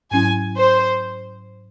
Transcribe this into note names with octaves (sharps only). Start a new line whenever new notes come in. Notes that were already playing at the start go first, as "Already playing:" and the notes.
G#2 F#3 C#4 E4 G#5
C5